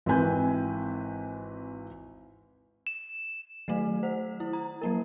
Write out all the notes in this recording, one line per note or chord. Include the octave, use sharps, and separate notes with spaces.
G#1 E3 C4 B4 G#5 G6
E7
D#3 F#3 A3
C5 F#5
E4
A#5
F#3 A#3 A#4